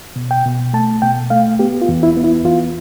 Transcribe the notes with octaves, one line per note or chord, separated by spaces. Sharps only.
B2
G5
B2
A3 A5
B2 G5
A3 F5
B3 G4
F4
E2
E4
B3
E4
E2 F4